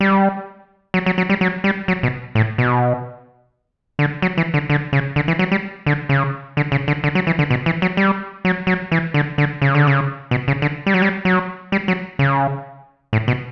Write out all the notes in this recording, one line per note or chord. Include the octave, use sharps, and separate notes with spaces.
G3
F#3
F#3
F#3
G3
F#3
G3
F#3
B2
A2
B2
D3
F#3
E3
D3
D3
C#3
D3
E3
F#3
G3
D3
C#3
D3
C#3
D3
D3
F#3
E3
D3
B2
E3
F#3
G3
F#3
F#3
E3
D3
D3
C#3
D3
C#3
B2
C#3
D3
G3
F#3
G3
F#3
G3
F#3
C#3
A2
B2